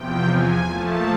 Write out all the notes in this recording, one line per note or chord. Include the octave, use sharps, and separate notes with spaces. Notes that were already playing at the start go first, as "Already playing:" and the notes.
Already playing: E2 C3 F3 G5
G#5
A#2 F3 A3 A5